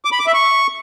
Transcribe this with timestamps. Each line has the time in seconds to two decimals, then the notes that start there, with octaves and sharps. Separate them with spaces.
0.05 D6
0.12 B5
0.19 D6
0.27 E5
0.34 C#6